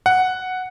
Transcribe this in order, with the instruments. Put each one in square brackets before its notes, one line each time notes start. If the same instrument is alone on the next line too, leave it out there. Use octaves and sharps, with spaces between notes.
[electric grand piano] F#5